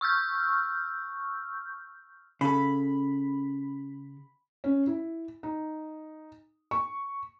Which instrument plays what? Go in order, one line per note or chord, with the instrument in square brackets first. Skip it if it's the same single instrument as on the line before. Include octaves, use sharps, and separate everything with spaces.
[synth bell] C#6 E6 F6 G6
[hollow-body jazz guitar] C#3 A4 [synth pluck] B5
[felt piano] C#4
E4
D#4
C#6